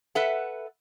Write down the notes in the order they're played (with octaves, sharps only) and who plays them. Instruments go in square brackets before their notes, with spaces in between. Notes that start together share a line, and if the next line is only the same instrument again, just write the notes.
[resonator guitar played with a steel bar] A4 B4 E5 F#5